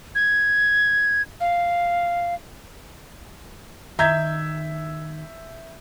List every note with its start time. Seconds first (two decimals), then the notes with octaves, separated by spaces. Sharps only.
0.15 G#6
1.41 F5
3.99 D#3 E5 A#5 G6 G#6